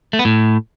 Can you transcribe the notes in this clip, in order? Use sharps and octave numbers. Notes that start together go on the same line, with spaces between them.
A3
B3
A2